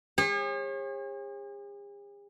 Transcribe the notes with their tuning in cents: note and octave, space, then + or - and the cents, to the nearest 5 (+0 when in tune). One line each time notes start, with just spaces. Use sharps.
G#4 -45 C#5 -40